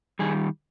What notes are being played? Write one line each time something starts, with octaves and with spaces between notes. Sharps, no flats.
D#3 G3 G#4